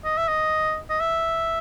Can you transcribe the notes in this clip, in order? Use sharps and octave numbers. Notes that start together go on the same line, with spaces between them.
D#5
E5
D#5
D#5
E5